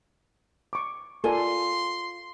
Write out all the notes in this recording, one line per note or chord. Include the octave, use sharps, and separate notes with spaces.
C#6 D6
F4 A4 A#4 D5 G#5 C6